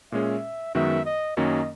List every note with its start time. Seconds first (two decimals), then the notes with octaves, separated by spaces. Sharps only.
0.12 A#2 G#3 C#4 G#4 E5
0.75 F#2 D#3 G#3 B3 F#4 E5
1.05 D#5
1.37 F#2 D#3 F#3 A#3 C#4 D#5